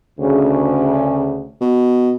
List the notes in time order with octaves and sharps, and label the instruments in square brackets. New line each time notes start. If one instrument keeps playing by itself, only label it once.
[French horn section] D2 C#3
[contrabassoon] B2